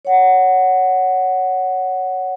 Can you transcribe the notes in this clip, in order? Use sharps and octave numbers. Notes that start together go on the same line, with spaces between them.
C#5 F#5